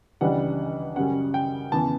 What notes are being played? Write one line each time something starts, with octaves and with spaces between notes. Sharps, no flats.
C#2 C#3 E3 G3 D4 F#5
F#2 C#3 G3 C#4 F#5
G5
E2 C#3 E3 B3 A5